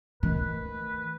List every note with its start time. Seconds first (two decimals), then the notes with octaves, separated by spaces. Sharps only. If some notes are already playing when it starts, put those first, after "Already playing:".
0.23 D#3 A3 B4